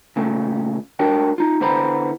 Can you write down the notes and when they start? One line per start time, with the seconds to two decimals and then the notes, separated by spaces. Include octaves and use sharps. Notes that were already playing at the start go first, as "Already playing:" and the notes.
0.16 A#2 C#3 A3
0.99 D4 F#4 A#4 C#5 G5
1.38 D#4 F4
1.61 D3 B3 E4 C5 A#5 B5